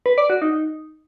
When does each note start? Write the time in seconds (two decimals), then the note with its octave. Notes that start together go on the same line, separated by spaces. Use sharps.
0.06 B4
0.18 D5
0.30 F#4
0.42 D#4